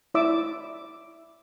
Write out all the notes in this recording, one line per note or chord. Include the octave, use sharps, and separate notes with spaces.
E4 D5 E5 D6 E6